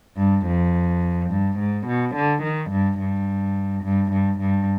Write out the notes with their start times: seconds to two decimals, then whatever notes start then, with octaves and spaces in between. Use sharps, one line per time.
0.18 G2
0.47 F2
1.31 G2
1.59 G#2
1.88 B2
2.16 D3
2.43 D#3
2.71 G2
3.00 G2
3.84 G2
4.13 G2
4.41 G2